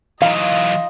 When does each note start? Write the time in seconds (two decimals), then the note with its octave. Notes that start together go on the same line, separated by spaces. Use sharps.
0.22 E3 F#3 D#4 F4 D#5 F5